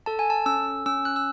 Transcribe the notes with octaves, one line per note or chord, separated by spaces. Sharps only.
A4 A5
G#5
A5
C#4 E6
C#4 E6
F#6
E6